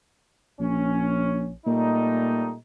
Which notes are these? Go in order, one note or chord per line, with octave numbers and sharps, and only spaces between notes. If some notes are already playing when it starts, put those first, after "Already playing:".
A#1 C#4
A#2 G3 A3 D#4